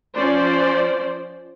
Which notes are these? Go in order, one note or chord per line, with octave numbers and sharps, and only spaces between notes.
F3 C#4 C5 D5